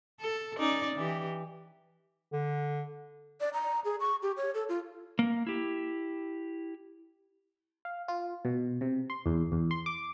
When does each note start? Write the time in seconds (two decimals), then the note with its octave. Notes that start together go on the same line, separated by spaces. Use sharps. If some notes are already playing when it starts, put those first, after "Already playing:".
0.21 A4
0.58 C#4 D#4 D5
0.96 E3 G4
2.32 D3
3.41 D5
3.53 A#5
3.85 G#4
4.00 C#6
4.22 G4
4.37 C#5
4.54 A4
4.69 F4
5.19 A#3
5.47 E4 G4
7.85 F5
8.08 F4
8.45 B2
8.81 C3
9.10 C6
9.26 E2
9.52 E2
9.71 C6
9.86 D6